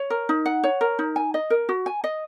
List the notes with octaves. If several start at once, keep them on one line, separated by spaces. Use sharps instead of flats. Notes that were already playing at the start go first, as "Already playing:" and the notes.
Already playing: C#5
A#4
D#4
F#5
C#5
A#4
D#4
G#5
D#5
A#4
F#4
G#5
D#5